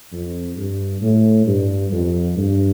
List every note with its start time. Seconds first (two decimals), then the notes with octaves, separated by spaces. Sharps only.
0.12 F2
0.57 G2
1.02 A2
1.47 G2
1.92 F2
2.37 G2